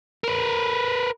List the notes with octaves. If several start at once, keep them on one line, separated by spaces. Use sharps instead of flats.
A#4 B4